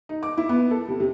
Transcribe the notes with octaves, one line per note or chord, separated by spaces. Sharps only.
D#4
D6
E4
B3
A4
C3
C3